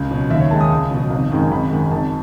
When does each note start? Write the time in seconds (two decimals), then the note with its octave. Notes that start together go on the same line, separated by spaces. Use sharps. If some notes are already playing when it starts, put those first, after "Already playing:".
Already playing: C#2
0.11 B2 F#3
0.30 D#2 E5
0.40 C#5
0.51 D#3 G#3 A5
0.60 D#6
0.70 C#2
0.91 B2 F#3
1.10 G#1
1.32 F#2 D#3 G#3
1.51 G#1 B5
1.71 F#2 D#3 G#3
1.91 G#1 A5